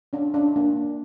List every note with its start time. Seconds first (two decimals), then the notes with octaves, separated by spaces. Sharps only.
0.13 C#4 D4
0.34 C#4 D4
0.56 A#3 D4
0.76 A#3